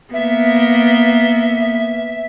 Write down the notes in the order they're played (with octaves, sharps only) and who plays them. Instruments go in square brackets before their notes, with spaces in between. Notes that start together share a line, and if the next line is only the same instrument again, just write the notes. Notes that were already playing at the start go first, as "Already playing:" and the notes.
[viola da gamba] A#3 B3 [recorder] E5